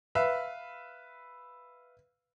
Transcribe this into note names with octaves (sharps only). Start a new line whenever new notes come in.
B4 E5 F5